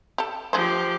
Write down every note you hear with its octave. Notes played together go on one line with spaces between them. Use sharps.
G4 A4
D3 F3 G4 G#4 C5